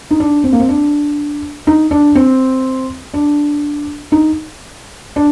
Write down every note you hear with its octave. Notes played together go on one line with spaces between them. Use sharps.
D#4
D4
C4
A#3
C4
D4
D#4
D4
C4
D4
D#4
D4